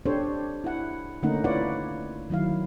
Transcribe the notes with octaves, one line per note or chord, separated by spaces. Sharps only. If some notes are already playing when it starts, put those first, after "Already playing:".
D4 G4 A4 C5 C#5
E4 F#5
D3 A3 A#3 C#4 D#4 F#5
E4 F4 B4 C#5 D5 F#5
D#3 F#3 E4 F5